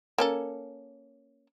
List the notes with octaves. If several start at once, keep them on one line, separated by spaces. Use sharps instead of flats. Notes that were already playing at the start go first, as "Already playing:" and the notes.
A#3 C#4 A4